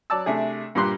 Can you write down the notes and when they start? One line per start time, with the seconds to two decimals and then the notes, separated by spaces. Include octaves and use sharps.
0.10 F#3 D5 A5 E6
0.26 C3 A3 D4 G#4
0.75 G2 A#2 G4 C6 F#6